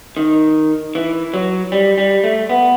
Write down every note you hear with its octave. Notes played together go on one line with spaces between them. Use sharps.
D#3
E3
F#3
G3
G3
A3
B3